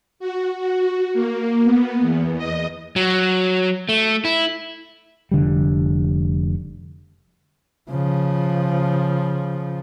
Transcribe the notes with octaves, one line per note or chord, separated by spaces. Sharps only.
F#4
F#4
A#3
B3
E2
D#5
F#3
A3
E4
F1 D3 G3
C#3 F3